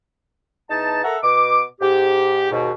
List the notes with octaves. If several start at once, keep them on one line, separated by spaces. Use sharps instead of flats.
E2 D#4 A5
A4 A#4 E5 F#5 A#5
B2 D6
G#2 G4
D#2 G#2 B2